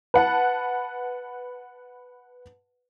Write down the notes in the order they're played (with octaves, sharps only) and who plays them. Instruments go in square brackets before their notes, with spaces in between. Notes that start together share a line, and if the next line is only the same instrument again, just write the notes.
[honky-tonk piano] B4 F#5 A5